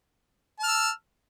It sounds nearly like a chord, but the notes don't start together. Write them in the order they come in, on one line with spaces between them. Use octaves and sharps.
A5 F6 E6